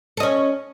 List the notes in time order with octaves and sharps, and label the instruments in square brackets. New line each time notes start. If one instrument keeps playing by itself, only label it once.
[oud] A4
D#5
C#4